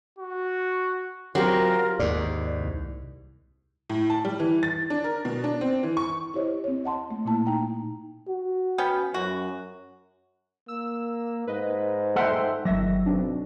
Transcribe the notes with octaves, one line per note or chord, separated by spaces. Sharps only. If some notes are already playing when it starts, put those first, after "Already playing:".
F#4
F#3 C4 F4 G4 A#4
D#2 G#2 D5
C2
A2
A5
G3
E3
A6
D4
A#4
B2
D4
C4
E3
C#6
E4 G4 C5 C#5 D#5
C4 C#5
D#5 F#5 A5 C6
A3
A#2 A#3 E4 A5
D#4 G5 A#5
F#4
B3 C#4 G5
F#2 F#4
A#3 E6
G#2 B4 D#5
A4 E5 F#5 G5 C6
G1 D#3 F#3 E5 A#6
B1 C4 D4